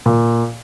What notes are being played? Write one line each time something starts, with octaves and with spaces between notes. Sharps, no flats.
A#2